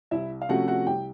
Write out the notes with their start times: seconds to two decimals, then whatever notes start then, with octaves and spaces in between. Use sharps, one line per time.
0.11 C2 E4 E5
0.42 F5
0.49 C3 F3 A3 C#4 F#4 F#5
0.68 F#4 F#5
0.87 C2 G4 G5